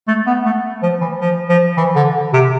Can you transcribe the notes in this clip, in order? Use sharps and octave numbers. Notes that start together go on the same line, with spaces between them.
A3
B3
A3
F3
E3
F3
F3
E3
D3
C3